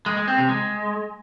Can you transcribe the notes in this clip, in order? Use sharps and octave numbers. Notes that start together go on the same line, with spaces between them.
G#3
G#3
C4
C3
G#3